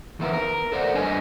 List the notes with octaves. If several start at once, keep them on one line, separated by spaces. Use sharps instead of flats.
D#3 E3 A#3 B3 E4 A#4
A#4
A4 C5 D5 E5 F#5
G2 D4 D#5 G#5